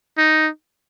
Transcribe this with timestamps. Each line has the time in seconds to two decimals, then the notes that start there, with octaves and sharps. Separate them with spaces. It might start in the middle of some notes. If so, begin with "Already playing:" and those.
0.18 D#4